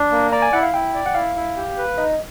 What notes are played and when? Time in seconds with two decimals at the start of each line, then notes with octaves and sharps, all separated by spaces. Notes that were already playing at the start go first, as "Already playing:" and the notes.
Already playing: D4
0.12 A#3
0.32 D5 A#5
0.42 G#5
0.53 E4 F#5
0.63 F5
0.74 E4 G5
0.94 D5
1.06 F#5
1.15 E4 F5
1.36 E4
1.57 G4
1.78 B4
1.98 D#4 D#5